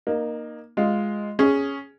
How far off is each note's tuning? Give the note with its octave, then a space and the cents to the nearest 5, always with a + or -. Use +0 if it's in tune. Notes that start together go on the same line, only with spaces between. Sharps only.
A#3 +10 D#4 -20
G#3 +0 F4 +0
C#4 +0 G#4 +0